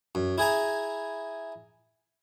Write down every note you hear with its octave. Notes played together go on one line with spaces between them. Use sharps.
F#2
E4 G#4 G#5 A#5